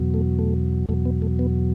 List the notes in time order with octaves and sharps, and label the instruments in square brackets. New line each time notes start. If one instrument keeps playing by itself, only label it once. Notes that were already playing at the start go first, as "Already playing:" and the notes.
Already playing: [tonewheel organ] E2 B2 F#3
A3
A3
E2 B2 F#3 A3
B3
A3
B3